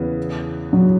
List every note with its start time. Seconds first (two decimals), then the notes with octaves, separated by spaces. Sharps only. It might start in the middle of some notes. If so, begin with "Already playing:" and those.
Already playing: E2 C#3 E3 B3
0.73 F#3